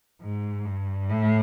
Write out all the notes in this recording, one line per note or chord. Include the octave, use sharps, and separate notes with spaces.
G#2
G2
A2